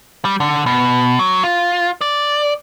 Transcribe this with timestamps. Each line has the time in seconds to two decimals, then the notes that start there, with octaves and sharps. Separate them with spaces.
0.25 G3
0.40 D3
0.66 B2
1.19 F#3
1.44 F4
2.01 D5